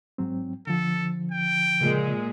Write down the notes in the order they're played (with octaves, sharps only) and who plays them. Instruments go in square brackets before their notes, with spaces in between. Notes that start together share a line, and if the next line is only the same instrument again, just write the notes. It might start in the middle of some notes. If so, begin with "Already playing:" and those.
[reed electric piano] G#2 F#3 C4
[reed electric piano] D3 F3 [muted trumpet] A4
[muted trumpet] G5
[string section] A#2 G#3 [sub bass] C#3